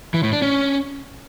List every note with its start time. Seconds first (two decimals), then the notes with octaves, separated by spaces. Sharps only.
0.14 E3
0.23 A2
0.33 D4
0.42 C#4